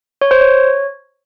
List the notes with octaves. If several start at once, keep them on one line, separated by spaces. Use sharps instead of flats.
C#5
C5
C#5